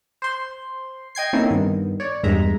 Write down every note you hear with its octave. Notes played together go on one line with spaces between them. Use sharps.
C5 C6
D#5 G5 G#6 C7
A#3 C4 C#4 D#4 E4 A4
G2 D#3 B3
C#5 D5
E2 G2 G#3 E5 A#5